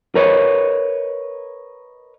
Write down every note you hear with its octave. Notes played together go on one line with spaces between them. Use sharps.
A#4 B4 C#5 D#5